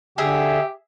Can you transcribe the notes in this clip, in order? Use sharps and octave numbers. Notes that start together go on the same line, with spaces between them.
D3 G4 G#4 E5